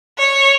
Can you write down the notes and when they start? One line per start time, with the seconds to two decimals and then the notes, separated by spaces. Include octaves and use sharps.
0.19 C#5